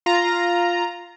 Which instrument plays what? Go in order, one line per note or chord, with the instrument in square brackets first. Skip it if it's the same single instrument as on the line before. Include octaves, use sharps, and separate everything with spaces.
[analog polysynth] F4 A#5